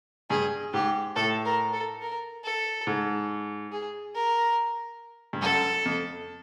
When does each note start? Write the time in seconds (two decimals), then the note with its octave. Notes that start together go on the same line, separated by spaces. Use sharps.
0.30 G2 G#4
0.73 G#2 G4
1.16 A2 A4
1.45 A#4
1.73 A4
2.02 A#4
2.44 A4
2.87 G#2
3.72 G#4
4.15 A#4
5.33 G2
5.42 F#2 A4
5.85 F2